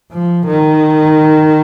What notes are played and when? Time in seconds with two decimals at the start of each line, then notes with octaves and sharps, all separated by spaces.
0.12 F3
0.47 D#3